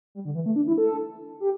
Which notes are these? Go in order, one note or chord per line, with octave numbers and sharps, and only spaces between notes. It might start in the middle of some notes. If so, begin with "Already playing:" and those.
G3
D3
E3
A3
D4
E4
A4
G4